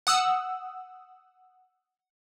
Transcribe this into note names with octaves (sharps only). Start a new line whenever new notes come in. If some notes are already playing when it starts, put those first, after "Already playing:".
F#5 D#6 E6